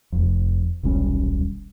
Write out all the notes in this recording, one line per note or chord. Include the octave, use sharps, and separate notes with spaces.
F1 F2
D#1 B1 G3 C#4